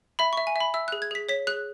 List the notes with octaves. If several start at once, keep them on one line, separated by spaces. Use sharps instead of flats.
E5 B5
E5 C#6
G#5
E5 B5
E5 E6
G#4 F#6
G#6
G#4 B6
C#5 B6
G#4 F#6